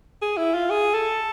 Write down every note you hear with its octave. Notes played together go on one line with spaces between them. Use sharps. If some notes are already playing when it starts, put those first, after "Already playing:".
G#4
E4
F4
G#4
A4